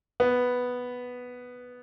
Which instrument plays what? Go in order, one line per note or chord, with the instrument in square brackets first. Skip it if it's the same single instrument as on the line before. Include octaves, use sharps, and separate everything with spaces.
[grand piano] B3